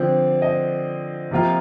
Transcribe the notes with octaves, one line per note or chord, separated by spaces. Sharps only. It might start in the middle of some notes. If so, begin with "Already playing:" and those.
Already playing: D3 F3 C4
D#5
C3 F3 A#3 F4